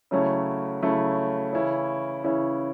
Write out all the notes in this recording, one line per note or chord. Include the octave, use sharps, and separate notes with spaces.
C#3 F#3 A3 C#4 E4
C#3 F#3 A3 C#4 E4
C#3 E3 C#4 E4
C#3 E3 C#4 E4